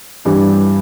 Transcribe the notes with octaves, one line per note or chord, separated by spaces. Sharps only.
G2 E3 G3